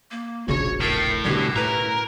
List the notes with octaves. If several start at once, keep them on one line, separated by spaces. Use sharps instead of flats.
A#3
E1 A#1 C#3 F#4 C#5
A2 A4 A#4 G5
B2 D3 G3 C#4 E4 F#4 G4
A2 A#4 B4